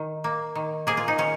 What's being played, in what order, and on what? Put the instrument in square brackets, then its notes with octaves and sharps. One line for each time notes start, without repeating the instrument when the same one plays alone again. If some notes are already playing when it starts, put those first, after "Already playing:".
Already playing: [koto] D#3
A#3
D#3
A#3 G#4
F4
D#4
D#3 C#4